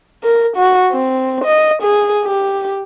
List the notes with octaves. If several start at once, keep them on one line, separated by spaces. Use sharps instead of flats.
A#4
F#4
C4
D#5
G#4
G4